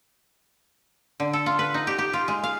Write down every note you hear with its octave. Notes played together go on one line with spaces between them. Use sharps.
D3
A4
F4
B4
D#4
G4
G4
F4
G#3
F5